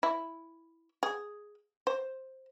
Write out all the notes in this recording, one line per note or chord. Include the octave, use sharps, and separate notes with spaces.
E4
G#4
C5